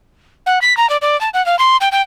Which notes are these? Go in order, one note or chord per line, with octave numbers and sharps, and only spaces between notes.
F#5
B6
A#5
D5
D5
A5
F#5
F5
C6
G5
G5